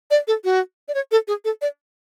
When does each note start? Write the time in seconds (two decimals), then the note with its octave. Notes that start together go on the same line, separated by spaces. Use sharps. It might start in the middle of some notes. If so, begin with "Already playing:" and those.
0.11 D5
0.28 A4
0.44 F#4
0.88 D5
0.95 C#5
1.12 A4
1.28 G#4
1.45 A4
1.62 D5